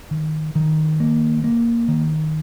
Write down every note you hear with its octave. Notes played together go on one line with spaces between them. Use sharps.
D#3
D#3
A#3
A#3
D#3